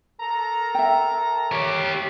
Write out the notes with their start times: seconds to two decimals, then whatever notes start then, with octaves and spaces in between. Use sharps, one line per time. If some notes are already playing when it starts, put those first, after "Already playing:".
0.20 A4 A#4 A#5
0.75 E5 G5
1.52 G4 C#5